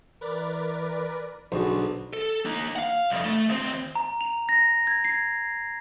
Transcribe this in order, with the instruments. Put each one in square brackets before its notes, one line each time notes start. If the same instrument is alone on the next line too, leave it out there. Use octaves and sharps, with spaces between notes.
[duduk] E3 [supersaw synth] A#4 B4 D5
[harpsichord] B1 [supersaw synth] D3 [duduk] D4 [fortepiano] F#4 G#4 C5
[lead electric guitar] A4
A#3 D#4
F5 F#5
C2 F2
A3
D#2 C4
[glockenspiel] A#5
F7
A#6
G#6
C7